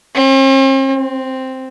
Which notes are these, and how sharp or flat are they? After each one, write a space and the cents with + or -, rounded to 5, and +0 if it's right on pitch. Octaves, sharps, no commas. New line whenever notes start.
C4 +45
C4 +0